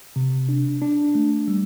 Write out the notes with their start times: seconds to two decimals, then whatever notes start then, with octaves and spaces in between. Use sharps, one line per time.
0.16 C3
0.49 D4
0.82 D4
1.15 A3
1.48 G3